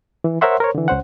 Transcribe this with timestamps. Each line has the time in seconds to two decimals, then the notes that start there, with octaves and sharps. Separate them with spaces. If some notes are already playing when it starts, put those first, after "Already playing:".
0.24 E3
0.41 A#4 C5 C#5 E5 F#5 C6
0.60 A#4 C5 C#5
0.75 D3 E3
0.88 C#2 C#4 C5 F#5